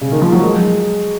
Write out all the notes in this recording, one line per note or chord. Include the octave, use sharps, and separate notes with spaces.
C#3
D#3
F3
F#3
G#3